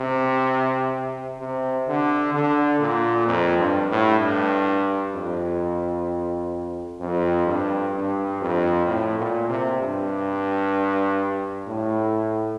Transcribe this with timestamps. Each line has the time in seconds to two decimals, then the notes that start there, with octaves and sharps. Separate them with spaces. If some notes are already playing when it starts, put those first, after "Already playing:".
Already playing: C3
1.39 C3
1.87 D3
2.33 D3
2.80 A#2
3.26 F2
3.58 G2
3.90 A2
4.20 G2
5.13 F2
7.00 F2
7.46 G2
7.94 G2
8.41 F2
8.86 A2
9.19 A#2
9.49 C3
9.81 G2
11.68 A2